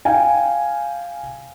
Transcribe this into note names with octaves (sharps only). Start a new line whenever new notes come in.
F5 G5 G#5